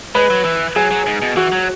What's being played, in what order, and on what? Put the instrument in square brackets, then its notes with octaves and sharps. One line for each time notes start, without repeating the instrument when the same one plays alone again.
[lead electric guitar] G#3 [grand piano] B4
[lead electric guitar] F#3
E3
[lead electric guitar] F#3 [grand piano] G#4
[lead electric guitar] F#3
G#2
B2
[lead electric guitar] E3 [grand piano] F#4
[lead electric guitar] F#3